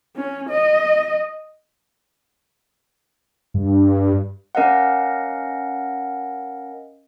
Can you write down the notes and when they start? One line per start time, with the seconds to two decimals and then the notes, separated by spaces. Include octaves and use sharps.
0.16 C#4
0.50 D#5
3.54 G2
4.55 C#4 A#4 D#5 F5 F#5